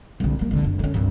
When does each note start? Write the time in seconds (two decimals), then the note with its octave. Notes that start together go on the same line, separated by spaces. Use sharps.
0.20 C2 D3
0.39 G3 A#3
0.51 C2 D3
0.63 F#1 D4
0.79 D3 C#4
0.94 C2 G2